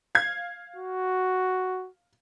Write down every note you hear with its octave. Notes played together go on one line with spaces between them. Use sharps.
F5 G#6
F#4